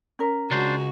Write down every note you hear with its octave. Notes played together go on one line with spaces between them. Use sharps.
C#4 A#4
C#3 G#3 D4 F#4 C5